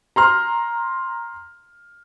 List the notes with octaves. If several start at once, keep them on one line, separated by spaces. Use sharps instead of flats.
A#5 C6 F6